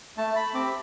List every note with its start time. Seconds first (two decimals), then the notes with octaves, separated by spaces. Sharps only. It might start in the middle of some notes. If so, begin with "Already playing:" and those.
0.17 A3 A5
0.36 B5
0.54 C4 G4 D6